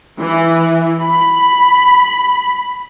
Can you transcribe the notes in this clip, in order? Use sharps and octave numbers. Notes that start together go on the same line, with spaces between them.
E3
B5